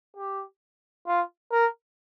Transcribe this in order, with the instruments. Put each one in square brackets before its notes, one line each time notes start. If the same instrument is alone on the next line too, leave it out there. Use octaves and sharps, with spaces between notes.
[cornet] G4
F4
A#4